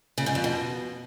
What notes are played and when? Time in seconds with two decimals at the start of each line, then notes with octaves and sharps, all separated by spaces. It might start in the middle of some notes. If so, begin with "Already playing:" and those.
0.18 C#3
0.26 G#2
0.35 F2
0.44 B2